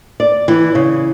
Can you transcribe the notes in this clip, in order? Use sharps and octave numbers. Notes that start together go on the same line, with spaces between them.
D5
E3
C#3